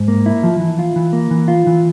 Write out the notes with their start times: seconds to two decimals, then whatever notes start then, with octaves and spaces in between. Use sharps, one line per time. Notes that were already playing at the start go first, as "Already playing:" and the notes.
Already playing: G#2
0.08 A#3
0.26 E4
0.43 F3
0.60 E3
0.79 F4
0.96 E3
1.13 A#3
1.31 E3
1.48 F4
1.67 E3